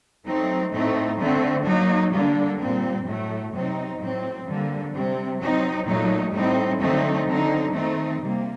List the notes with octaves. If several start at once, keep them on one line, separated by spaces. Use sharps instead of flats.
F#3 A3 C4 D#4
A2 A3 C4 D#4
D3 A3 C4
F#3 A#3 D#4
D3 G3 A#3 D4
A#2 G3 C4
A2 F#3 A3
C3 F#3 C4 D#4
A2 F#3 C4
D3 G3 A#3
C3 G3 C4
F#3 C4 D#4
A#2 F#3 A3 D#4
A2 G3 C4 D#4
D3 F#3 A3 C4 D#4
D3 F#3 C4 D#4
D#3 A3 C4 D#4
C3 G3 A#3